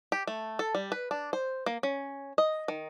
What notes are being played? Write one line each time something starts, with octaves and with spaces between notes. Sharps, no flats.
G4
A3
A4
G3
B4
D4
C5
A#3
C#4
D#5
D#3